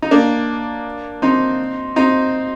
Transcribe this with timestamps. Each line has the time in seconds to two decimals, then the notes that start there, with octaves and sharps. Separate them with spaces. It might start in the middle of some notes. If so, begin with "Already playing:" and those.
0.02 D#4
0.11 A#3 D4
1.22 C4 D#4
1.96 C4 D#4